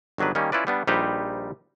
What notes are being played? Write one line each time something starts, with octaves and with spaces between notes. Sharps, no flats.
G1 D#3 F#3 D4 B4
D#3 G3 A#3 C#4
C#4 E4 F4 B4 D5
G3 B3 D4
A#1 G3 D#4 G4 B4 C5